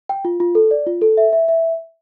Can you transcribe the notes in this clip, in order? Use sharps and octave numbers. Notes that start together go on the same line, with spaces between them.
G5
F4
F4
A4
D5
F4
A4
E5
E5
E5